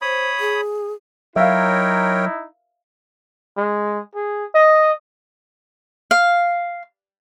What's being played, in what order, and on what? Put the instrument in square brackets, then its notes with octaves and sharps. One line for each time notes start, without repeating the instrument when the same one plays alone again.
[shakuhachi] C5 [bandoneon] C#5 B5 D#6
[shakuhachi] G#4
[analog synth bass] F#3 [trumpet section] D#4 E4 [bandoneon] A#4 C#5 G5 [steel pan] E5 F5
[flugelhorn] G#3
G#4
D#5
[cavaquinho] F5